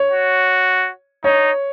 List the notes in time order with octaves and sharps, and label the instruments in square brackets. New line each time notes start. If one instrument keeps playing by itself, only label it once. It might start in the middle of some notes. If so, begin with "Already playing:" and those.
Already playing: [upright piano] C#5
[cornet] F#4
[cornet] D#4 [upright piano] C#5